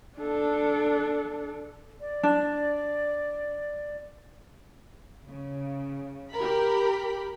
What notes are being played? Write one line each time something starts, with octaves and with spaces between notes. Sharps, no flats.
D4 A4
D5
D4
C#3
G4 A#4 B5